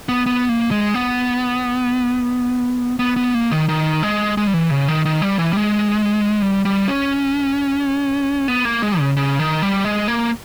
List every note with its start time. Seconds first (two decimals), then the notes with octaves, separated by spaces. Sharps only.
0.09 B3
0.26 B3
0.49 A#3
0.71 G#3
0.94 B3
2.99 B3
3.16 B3
3.34 A#3
3.52 D#3
3.69 D#3
4.03 G#3
4.37 G#3
4.47 G3
4.54 E3
4.71 C#3
4.88 D#3
5.05 D#3
5.22 G3
5.39 E3
5.53 G3
5.57 G#3
6.42 G3
6.65 G3
6.88 C#4
8.48 B3
8.65 A#3
8.82 G#3
8.99 C#3
9.17 C#3
9.39 D#3
9.62 G3
9.85 G#3
10.08 A#3